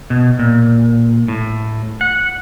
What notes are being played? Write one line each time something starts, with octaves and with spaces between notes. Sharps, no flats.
B2
A#2
A2
F#5